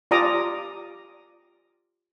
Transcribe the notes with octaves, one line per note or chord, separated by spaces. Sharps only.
F4 G4 D5 A#5 D6 D#6